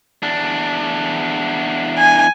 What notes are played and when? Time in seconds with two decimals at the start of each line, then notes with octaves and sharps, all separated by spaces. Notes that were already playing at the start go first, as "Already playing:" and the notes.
0.23 E2 D4
1.98 G#5